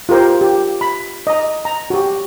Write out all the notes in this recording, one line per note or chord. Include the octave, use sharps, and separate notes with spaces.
F4 G4 A#4 C5
G4
B5
D#5 A#5
A#5
F#4 G4